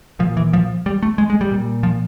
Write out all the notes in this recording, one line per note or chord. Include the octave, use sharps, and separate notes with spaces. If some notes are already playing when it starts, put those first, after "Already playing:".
A#2 F3
E3
F3
G3
A3
G#3
G#3
G3
A#2
F3